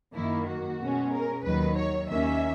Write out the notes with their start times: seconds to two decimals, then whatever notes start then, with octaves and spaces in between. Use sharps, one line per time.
0.14 F#2 D#3 A#3 E4
0.46 F#4
0.79 B2 G#3 C#4
1.11 A#4
1.44 D#2 D#3 F#3 B4
1.76 C#5
2.09 D#2 D#3 A#3 C#4 E5